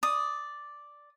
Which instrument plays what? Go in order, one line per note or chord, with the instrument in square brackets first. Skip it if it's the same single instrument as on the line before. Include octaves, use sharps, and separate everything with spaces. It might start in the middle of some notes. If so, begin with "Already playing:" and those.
[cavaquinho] D5 D#6